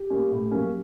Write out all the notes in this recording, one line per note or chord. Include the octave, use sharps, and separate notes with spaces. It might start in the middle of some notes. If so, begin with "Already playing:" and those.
Already playing: G4
G3 A#3 C#4
A2
F#3 A#3 C#4